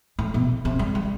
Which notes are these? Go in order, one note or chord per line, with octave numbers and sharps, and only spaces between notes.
A2
B2
C3
G3
G3